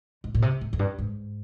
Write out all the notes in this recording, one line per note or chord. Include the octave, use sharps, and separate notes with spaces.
G#2
A#2
C3
G#2
F2
G2
G#2